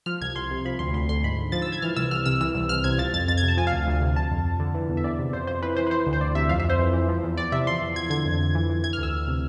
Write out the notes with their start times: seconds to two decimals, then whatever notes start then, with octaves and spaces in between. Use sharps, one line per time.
0.06 F3 F6
0.21 C2 G#6
0.36 C2 C6
0.51 C3
0.65 F3 B5
0.79 D2 C6
0.94 D2 C6
1.09 D3 C6
1.24 G#2 B5
1.39 G#2
1.52 F3 A6
1.62 E6
1.67 F3
1.72 G#6
1.82 E3 F6
1.96 C2 E6
2.11 C2 F6
2.26 C3 E6
2.40 E3 E6
2.55 C2
2.69 C2 F6
2.84 C3 G#6
2.98 F3 A6
3.14 F2 A6
3.28 F2 A6
3.37 G#6
3.43 C3
3.48 A5
3.57 F3 G#5
3.67 F5
3.72 D2
3.87 D2
4.02 C3
4.16 F3 A5
4.31 F2
4.45 F2
4.60 D3
4.75 E3
4.89 E2
4.97 E5
5.04 E2 D5
5.19 C3
5.33 F2 C5
5.47 F2 C5
5.62 E3 B4
5.77 E3 C5
5.87 B4
5.91 E3 C5
6.06 D2
6.13 C5
6.21 D2 D5
6.35 C3 E5
6.49 F2 F5
6.60 E5
6.65 F2 C5
6.79 E3
6.93 E3
7.09 F3
7.24 E2
7.37 E2 D5
7.52 C3 E5
7.67 F3 C6
7.81 E2
7.96 E2 G#6
8.10 D3 G#6
8.25 F2
8.40 F2
8.55 E3
8.69 E3
8.84 E3 G#6
8.93 F6
8.98 D2 E6
9.13 D2
9.28 C3